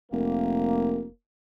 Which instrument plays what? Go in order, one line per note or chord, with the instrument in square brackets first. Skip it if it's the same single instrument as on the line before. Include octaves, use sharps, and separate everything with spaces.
[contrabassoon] F1 [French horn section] A#3